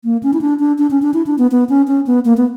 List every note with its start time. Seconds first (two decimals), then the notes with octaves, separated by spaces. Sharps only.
0.04 A#3
0.23 C#4
0.34 E4
0.41 D4
0.60 D4
0.78 D4
0.91 C#4
1.02 D4
1.14 E4
1.26 D4
1.38 B3
1.51 B3
1.69 C#4
1.88 C#4
2.07 B3
2.25 A#3
2.37 B3